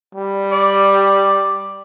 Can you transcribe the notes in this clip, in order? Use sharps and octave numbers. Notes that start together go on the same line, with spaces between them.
G3
D5